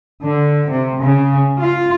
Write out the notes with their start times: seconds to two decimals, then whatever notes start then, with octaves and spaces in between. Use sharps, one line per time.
0.23 D3
0.68 C3
1.02 C#3
1.60 F4